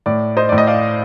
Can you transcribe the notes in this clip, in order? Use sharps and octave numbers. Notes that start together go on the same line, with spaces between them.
A2 D5
C5 D#5
A2 D5
D#5
D5 F5